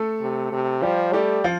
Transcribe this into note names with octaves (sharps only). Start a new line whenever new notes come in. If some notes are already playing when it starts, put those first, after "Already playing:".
Already playing: A3 A4
C3
C3
F3 G3 G4
G3 A3 G4
F3 F4